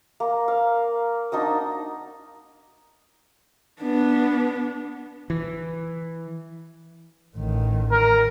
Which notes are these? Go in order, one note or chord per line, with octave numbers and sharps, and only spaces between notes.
A#3
F5
D4 D#4 F#4 D#6
B3 D4
E3
A1 D#3
A#4